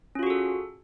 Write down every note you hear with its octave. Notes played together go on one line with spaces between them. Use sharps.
C#4 F4 F#4 G#4 A4